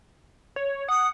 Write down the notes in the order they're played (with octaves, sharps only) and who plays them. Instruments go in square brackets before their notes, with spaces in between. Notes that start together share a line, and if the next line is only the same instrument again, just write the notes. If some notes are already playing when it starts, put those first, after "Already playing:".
[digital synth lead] C#5
[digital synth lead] F#5 [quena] D#6